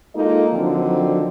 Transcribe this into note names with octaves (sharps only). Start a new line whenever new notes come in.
G#3 A#3 D#4 F4 A4 D#5
D3 D#3 F3 F#3 C4 D4